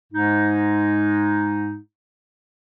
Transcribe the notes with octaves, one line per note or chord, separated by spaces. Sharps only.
G#2 G#3 D#4